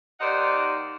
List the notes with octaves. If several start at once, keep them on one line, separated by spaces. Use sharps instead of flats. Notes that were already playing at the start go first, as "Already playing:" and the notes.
D#2 D#4 C5 D5 F#5